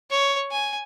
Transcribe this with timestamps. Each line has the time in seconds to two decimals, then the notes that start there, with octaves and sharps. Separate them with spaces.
0.11 C#5
0.51 G#5